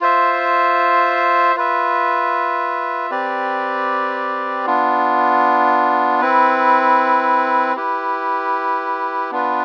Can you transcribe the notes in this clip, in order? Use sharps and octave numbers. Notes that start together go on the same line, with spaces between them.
F4 C5 E5
F4 B4 E5
C4 G4 B4 D5
B3 D4 F4
C4 E4 B4
E4 G4 B4
B3 D4 F4 B4